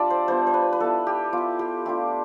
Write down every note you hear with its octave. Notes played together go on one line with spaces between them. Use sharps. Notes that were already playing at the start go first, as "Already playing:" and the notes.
Already playing: G3 D4 F4 D5 E5
C5
G3 B3 D4 F4 C5
C5
B4
B4
B3 E4 A4
G4
B3 E4 F4
G4
A3 D4 F4 G4